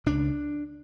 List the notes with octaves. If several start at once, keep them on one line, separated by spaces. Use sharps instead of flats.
C#2 C#3 D4